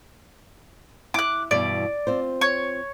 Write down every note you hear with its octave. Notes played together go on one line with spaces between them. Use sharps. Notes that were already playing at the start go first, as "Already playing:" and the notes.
E4 D6 F#6
G2 B2 E3 D5
C4 F4 C5
C#5